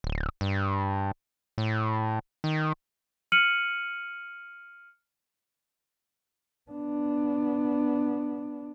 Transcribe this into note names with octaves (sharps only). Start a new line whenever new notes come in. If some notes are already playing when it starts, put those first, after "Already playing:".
D1
G2
A2
D#3
F6 C#7 D#7 F#7
B3 D4